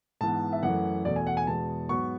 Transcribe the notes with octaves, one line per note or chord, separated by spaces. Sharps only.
G#2 E3 B3 A5
E5
F#2 E3 A3 F#5
E2 B2 A3 D5
G#5
F#5
G#5
E2 B2 G#3 A5
G#2 F#3 B3 C#6